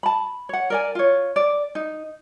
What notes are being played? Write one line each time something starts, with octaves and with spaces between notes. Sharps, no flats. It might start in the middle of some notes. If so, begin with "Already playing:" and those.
A5 B5
C#5 F#5
A#4 D5 G#5
F4 C#5
D5
D#4